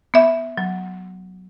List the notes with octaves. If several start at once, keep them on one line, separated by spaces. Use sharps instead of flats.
B3 E5
F#3